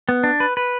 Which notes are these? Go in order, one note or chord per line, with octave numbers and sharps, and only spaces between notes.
B3
D4
B4
B4